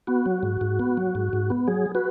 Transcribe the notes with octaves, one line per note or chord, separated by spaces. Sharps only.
B3 F#4
F#3
G#2
G#2
B3
F#3
G#2
G#2
B3
F#3 G#4
F#4 B4